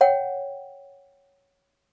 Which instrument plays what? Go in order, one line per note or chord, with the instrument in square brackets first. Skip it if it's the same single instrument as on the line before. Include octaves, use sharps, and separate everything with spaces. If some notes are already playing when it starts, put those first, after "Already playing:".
[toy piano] C#5 F#5 G5